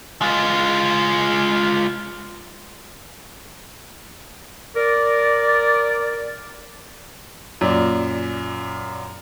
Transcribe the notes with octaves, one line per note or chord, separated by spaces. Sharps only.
G#3 F4
A#4 D5
F#2 A#2 D5